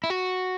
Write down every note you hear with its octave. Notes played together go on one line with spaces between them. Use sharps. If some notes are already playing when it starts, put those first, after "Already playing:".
E4
F#4